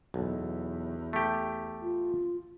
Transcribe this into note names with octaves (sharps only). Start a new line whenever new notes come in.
B1 E2
A3 G4
F4